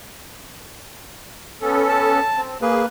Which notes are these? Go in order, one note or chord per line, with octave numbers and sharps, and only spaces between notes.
B3 C#4 A4
A5
C4
A#3 G#4 B4